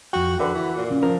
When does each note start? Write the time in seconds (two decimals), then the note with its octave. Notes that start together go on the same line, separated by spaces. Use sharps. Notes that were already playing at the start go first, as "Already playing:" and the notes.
0.13 F2 F#4 G5
0.39 D3 F#4 B4
0.54 E3
0.77 A#2
0.90 C#3
1.03 F3 A#4